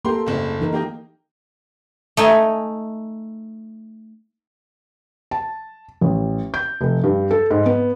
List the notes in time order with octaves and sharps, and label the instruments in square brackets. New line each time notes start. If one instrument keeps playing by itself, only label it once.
[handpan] A#3 A4 [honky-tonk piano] G4 A#4 C6
[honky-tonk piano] F#1 C2
[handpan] E3 D#4 A#4
[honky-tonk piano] A#3 G4 D#5
[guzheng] A3 D#4 G#5
[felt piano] A5
A1
G6
F1
G2
A4
G#2
B3